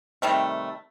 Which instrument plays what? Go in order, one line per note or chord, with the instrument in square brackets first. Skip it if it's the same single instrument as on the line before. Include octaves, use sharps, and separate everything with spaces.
[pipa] C3 D#3 G3 A3